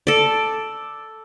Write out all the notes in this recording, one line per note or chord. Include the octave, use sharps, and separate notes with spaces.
A4 D5